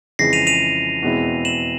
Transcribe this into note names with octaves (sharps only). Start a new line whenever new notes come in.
F2 C#3 E3 G#3 A#6 C7
D#7 F7
D#7 F7
E2 B2 G#3 C4 E4
E7 F#7